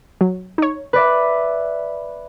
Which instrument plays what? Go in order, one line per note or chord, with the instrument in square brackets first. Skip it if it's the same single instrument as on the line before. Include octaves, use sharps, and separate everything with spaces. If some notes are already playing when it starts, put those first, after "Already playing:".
[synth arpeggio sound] F#3
D#4 C#5
[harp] B4 D5 E5